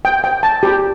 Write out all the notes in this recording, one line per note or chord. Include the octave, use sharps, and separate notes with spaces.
G5
G5
A5
G4